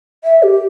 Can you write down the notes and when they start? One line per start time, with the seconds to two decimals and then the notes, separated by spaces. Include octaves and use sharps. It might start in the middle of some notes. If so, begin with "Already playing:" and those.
0.24 E5
0.43 G4